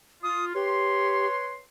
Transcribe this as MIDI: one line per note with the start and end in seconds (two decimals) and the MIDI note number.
0.23 0.52 65
0.23 0.45 87
0.54 1.27 67
0.54 1.60 71
0.54 1.60 73
0.54 1.60 84